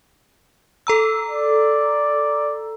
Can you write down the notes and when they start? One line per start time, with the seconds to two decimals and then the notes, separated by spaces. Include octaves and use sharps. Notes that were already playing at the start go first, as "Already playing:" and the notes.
0.87 A4 A#5 E6
1.29 D5